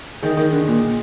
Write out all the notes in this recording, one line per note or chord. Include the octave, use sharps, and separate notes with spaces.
D#3 G#4 D#5 G5
D#3
D3
A#2